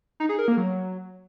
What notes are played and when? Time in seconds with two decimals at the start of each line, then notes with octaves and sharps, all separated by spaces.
0.20 D#4
0.29 G#4
0.39 A#4
0.48 A#3
0.57 F#3